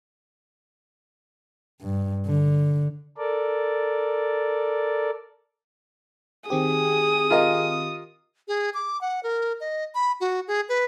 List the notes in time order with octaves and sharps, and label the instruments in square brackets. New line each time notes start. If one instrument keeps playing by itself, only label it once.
[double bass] G2
D3
[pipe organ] A4 A#4 D5
[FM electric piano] D#3 C4 G4 [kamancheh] G#4 [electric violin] D#6
[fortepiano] F4 A#4 D#5
[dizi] G#4
D6
F#5
A#4
D#5
B5
F#4
G#4
B4